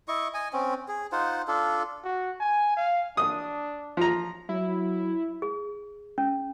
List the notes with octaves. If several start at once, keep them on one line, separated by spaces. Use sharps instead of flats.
E4 D#5 C#6
D#5 G#5
C4 C#4
G#4
D#4 F4 C5 F#5
D4 F4 A4
F#4
G#5
F5
D4 D#6
F3 A#5
F#3 E4
G#4
C#4